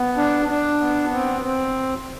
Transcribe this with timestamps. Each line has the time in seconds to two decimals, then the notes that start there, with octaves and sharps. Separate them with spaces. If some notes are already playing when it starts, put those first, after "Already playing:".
Already playing: B3
0.17 D4
0.49 D4
0.80 B3
1.12 C4
1.44 C4